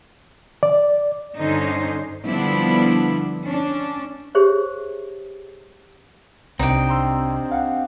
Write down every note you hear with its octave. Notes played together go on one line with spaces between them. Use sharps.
D5
G2 D3 C#4 D#4 C5
D3 F3 G3 B3 D4 E4
C#4 D4
G4 G#4 C5 C#5 E5
C2 C4 D4 D#4 G4 G5
A#5 C6 E6
F5 F#5